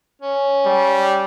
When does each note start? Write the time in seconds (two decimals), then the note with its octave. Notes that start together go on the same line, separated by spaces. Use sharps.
0.22 C#4
0.66 G3